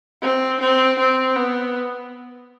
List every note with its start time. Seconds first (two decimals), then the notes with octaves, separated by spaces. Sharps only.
0.23 C4
0.61 C4
0.99 C4
1.36 B3